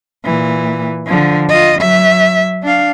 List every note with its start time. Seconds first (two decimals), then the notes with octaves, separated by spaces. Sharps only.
0.24 A#2 E3
1.06 D3 F3
1.49 F4 D#5
1.79 F#3 E5
2.63 D4 F5